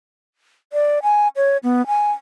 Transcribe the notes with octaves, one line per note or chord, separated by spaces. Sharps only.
D5
G#5
C#5
B3
G#5